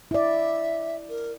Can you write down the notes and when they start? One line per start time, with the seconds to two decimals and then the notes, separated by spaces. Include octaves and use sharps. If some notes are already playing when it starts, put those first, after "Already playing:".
0.11 E4 D5 E5
1.09 A#4